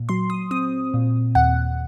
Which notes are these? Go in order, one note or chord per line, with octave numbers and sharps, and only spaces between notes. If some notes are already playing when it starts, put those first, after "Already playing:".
Already playing: A#2
F#3 C6
D#6
C4 D#6
A#2
D#2 F#5